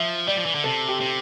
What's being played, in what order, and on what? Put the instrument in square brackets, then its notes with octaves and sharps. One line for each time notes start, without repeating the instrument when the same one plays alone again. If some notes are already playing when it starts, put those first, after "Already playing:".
Already playing: [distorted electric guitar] F3 [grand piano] E5
[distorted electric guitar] G3 [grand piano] D5
[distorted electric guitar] F3
E3
D3
[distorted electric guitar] C3 [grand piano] A4
[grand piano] G4
[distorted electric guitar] C3